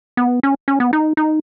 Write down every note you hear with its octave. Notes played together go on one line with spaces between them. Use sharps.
B3
C#4
C#4
B3
D#4
D#4